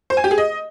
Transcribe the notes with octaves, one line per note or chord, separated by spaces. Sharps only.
C5
G#5
G4
G#4
D#5